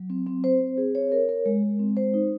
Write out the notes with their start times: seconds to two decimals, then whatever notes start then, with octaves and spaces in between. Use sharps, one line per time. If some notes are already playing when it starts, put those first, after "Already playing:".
Already playing: F#3
0.10 C4
0.27 C4
0.44 C5
0.61 C4
0.78 G#4
0.95 C#5
1.12 A#4
1.29 A#4
1.46 G#3
1.63 G#3
1.79 C4
1.97 C5
2.14 D#4